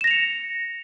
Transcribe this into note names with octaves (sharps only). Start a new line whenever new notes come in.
A#6 C#7 E7 F7